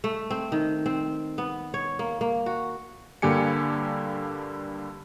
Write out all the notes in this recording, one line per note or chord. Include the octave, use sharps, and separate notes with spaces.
A3
C4
D#3
C4
B3
C#5
A#3
A#3
F#4
G2 D3 A#3 G4 G#5 C#7